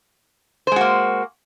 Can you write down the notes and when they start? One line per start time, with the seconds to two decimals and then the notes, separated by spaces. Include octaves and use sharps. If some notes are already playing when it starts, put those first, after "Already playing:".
0.67 C5
0.72 G#3
0.76 F#4
0.81 A#3